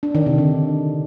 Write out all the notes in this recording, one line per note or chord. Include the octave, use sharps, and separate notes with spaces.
D4
D#3
C3
D3